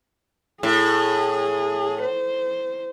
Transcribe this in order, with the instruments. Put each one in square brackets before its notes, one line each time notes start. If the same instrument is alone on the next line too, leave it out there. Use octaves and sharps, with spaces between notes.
[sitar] A2 [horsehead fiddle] G#4
[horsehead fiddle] C5